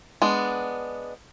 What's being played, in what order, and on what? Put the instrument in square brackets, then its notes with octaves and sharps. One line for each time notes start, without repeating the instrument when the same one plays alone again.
[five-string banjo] G#3 B3 D4